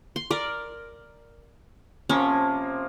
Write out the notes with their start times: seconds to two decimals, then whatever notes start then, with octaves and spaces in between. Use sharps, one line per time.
0.16 C6
0.31 A#4 D5
2.09 C3 F3 A#3 C#4